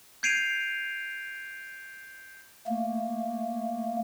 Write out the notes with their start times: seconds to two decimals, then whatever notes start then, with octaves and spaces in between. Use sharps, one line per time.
0.23 G6 G#6 C7 D7 D#7 F7
2.67 A3 A#3